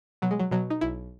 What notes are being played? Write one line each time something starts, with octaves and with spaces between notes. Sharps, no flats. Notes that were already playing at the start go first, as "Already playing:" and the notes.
B2 F#3
G#3
F#3
B2 F#3
D#4
B1 E4